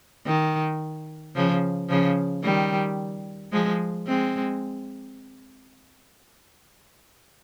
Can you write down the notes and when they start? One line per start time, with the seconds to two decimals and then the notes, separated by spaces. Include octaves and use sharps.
0.26 D#3
1.36 C#3 F3
1.89 C#3 F3
2.44 D#3 G3
3.52 F3 G#3
4.07 G#3 C4